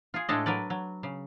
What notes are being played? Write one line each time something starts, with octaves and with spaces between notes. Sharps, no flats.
F4 G#4
A2 G#3 D4 A4 C#5 D#5
F#3 A#4 B4 D5
F#3
C#3